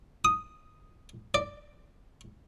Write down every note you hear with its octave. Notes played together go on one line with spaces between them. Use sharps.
D#6
D5